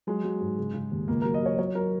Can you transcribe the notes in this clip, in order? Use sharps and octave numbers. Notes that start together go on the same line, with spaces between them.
F#3 G#3
F#3
G#2
C#3
C#3
D#2
C#2 A#3
F#3 A#4
D#5
F#3 C#5
F#3 C#5
F#3 A#4